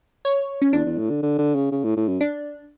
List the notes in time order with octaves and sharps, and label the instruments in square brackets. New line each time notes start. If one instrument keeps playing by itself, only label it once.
[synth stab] C#5
C#4
[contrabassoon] E2 [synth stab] D4
[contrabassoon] E2
A2
D3
D3
D3
C#3
C#3
A2
A2
F#2
[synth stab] D4